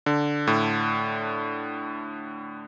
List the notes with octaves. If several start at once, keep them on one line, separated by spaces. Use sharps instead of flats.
D3
A2